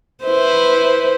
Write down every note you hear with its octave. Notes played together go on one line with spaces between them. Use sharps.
E4 B4 C5